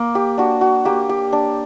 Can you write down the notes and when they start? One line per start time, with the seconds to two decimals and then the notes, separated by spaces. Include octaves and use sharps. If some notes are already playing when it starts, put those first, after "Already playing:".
Already playing: A#3
0.15 G4
0.38 D4 F#4
0.61 F#4
0.85 A#3 G4
1.09 G4
1.33 D4